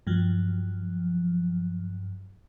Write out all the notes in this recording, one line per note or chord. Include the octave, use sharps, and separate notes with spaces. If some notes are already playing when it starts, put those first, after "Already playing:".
G2 F3 F#3